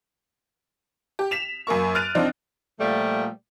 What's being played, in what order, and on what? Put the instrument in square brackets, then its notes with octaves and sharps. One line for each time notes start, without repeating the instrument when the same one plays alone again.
[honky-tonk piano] G4
B6 E7 F7
F#2 A#3 A#4 C#6
F6 F#6 A6 D7 D#7 F7
F3 C4 D4 D#4
[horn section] A#2 F3 G3 A3